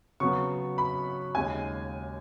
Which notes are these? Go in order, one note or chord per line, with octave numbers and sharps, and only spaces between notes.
C#3 F#3 B3 C#6
B5
D#2 C#3 G#3 G#5